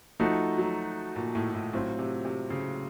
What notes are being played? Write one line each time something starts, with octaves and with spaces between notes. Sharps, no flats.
F3 A3 D#4 F#4
F#3
A#2
A2
A2
A2 F#3 C4 F4
C3
C3
C#3